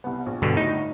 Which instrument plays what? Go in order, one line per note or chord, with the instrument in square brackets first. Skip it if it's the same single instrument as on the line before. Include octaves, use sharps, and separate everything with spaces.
[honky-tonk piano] C2 B3
A#1
[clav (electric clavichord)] G2 B2 D3
[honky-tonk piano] D2 A2 [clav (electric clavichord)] D#4